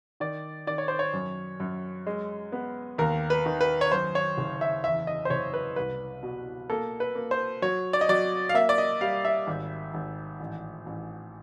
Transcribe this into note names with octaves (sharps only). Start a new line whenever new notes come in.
D#3 D5
D#3 D5
C#5
C5
C#5
F#2
F#2
G#3
B3
D#2 A#4
B4
D#3
B4
C#5
F#2 C5
C#5
F#1
E5
E2 E5
D#5
C5
F#1 C#5
B4
C2 B4
B2
A#3 A4
B4
A#3
C5
F#3 C#5
D5
D#5
F#3 D5
F5
A#3 E5
D5
D#5
G3 F5
E5
G#1
G#1
A1
A1